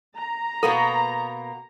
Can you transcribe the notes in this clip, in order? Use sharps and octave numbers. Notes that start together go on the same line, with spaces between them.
A#5
B2 A#3 B3 A4